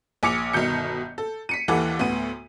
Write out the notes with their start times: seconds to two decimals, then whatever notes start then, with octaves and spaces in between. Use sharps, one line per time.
0.23 A#1 G#5 D6 C#7 F7
0.53 G1 B2 D#3 G6 C#7
1.18 A4
1.49 B6 C#7 D#7
1.68 D#2 E3 A4 F#5 D6
1.99 D2 A2 B3 D#7